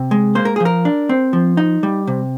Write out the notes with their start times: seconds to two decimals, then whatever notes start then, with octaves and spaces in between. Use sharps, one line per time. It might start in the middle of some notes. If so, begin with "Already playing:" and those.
Already playing: C3
0.11 G#3
0.35 A#3 C5
0.45 A#4
0.56 G#4
0.60 F3
0.65 A#4
0.85 D4
1.09 C4
1.33 F3
1.57 D#4
1.83 G3
2.07 C3